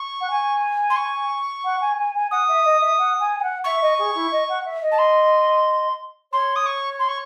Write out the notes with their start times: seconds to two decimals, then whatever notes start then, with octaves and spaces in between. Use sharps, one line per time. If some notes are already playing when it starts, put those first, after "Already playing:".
Already playing: C#6
0.20 F#5
0.30 G#5
0.90 C6
0.96 C#6
1.64 F#5
1.80 G#5
1.98 G#5
2.14 G#5
2.31 F#5 D#6
2.48 E5
2.64 D#5
2.80 E5
2.98 F#5
3.19 G#5
3.38 G#5
3.42 F#5
3.64 E5 C#6
3.81 D#5
3.98 G#4
4.15 E4
4.31 D#5
4.48 F#5
4.65 E5
4.81 D#5
4.92 A5
4.98 C6
6.32 C#5 C6
6.56 D#6
6.66 C#6
6.99 C6
7.09 C#6